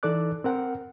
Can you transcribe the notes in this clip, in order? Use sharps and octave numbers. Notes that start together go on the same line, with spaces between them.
E3 D#4 A4 D5 D6 F#6
C4 A#4 F#5 G5